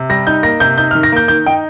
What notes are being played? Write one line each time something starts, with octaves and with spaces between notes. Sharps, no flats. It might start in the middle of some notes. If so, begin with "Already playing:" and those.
Already playing: C3
G3 A#6
D#4 G6
A#3 A#6
C3 G6
D#4 G6
F6
D#3
A#6
A#3 G6
D#3 G6
D#4 G5